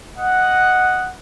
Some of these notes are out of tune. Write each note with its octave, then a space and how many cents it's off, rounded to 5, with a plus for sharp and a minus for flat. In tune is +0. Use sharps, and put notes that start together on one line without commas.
D#5 +0 F#5 +0